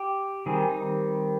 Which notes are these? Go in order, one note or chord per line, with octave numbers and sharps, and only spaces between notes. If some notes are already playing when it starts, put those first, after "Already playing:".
Already playing: G4
D#3 G3 C4 G#4
D#4